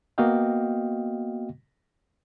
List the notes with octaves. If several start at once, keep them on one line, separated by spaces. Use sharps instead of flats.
A#3 B3 F#4 D#5 F5 G5